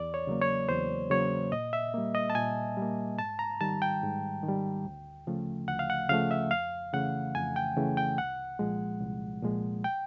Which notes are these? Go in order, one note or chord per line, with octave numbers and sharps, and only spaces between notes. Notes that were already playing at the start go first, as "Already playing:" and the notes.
Already playing: E2 D5
C#5
C#3 F#3 A#3
C#5
E2 C5
C#3 F#3 A#3 C#5
A#2 D#5
E5
G3 A#3
D#5
A5
A#2 G#5
G3 A#3
G#2 A5
A#5
D#3 G3 A5
G5
G#2
D#3
G3
D2
C#3 F3 A3
D2 F#5
F5
F#5
C#3 F3 A3 F5
E5
F2 F5
C#3 E3 A3 F#5
F2 G#5
G5
C#3 E3 A3
G5
C2 F#5
A#2 F3 G#3
C2
A#2 F3 G#3
G5